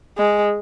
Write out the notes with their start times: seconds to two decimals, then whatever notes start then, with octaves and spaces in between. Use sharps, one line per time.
0.17 G#3